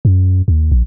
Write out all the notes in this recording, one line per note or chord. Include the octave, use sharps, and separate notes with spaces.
F#2
D#2
A#1